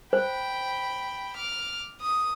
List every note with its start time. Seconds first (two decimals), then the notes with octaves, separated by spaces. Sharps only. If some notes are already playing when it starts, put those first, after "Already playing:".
0.13 C5 G5 B5
1.36 D6 F6
2.01 D#6